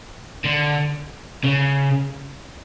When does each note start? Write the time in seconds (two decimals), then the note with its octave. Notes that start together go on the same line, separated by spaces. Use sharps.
0.45 D3
1.44 C#3